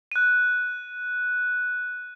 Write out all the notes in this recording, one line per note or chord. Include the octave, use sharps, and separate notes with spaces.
F#6 D#7